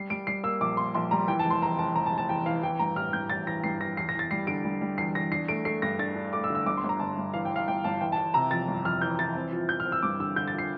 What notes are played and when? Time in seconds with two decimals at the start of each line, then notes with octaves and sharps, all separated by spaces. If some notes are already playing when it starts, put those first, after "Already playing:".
Already playing: G3 C7
0.10 G3 D7
0.27 G3 C7
0.43 A#3 E6
0.61 A#1 D6
0.77 A#3 C6
0.94 A#1 C6
1.11 G3 A#5
1.28 E3 G5
1.39 A5
1.45 F1
1.50 C6
1.62 E2 A#5
1.78 F1 A5
1.95 F1 A#5
2.06 A5
2.12 F1
2.18 A5
2.29 E2 G5
2.46 E3 F5
2.63 E3 G5
2.79 G2 A#5
2.96 A1 F6
3.13 G2 G6
3.30 A1 A6
3.47 E3 A#6
3.64 G2 C7
3.80 E3 A#6
3.97 E2 C7
4.09 A#6
4.14 E2 A6
4.31 G3 C7
4.47 D3 D7
4.64 G3
4.81 G3
4.98 E2 C7
5.15 E2 A#6
5.32 D4 C7
5.48 A3 D7
5.65 A3 C7
5.82 G2 A#6
5.99 D4 A6
6.16 D4
6.33 A3 D6
6.44 E6
6.50 D3
6.55 E6
6.66 G1 D6
6.77 C6
6.84 G1
6.89 A#5
7.00 G1 A5
7.17 G2
7.34 E3 F5
7.45 G5
7.51 E3 F5
7.68 G1 G5
7.84 G1 A5
8.01 E3 G5
8.12 A5
8.18 E3
8.34 C3 A#5
8.51 F2 A6
8.68 G1
8.85 F2 F6
9.01 E3 G6
9.19 E3 A6
9.36 C4
9.52 F3
9.69 F3 G6
9.80 F6
9.85 C4
9.92 E6
10.03 G2 D6
10.20 D3 E6
10.36 D3 G6
10.48 A6
10.54 F3 C7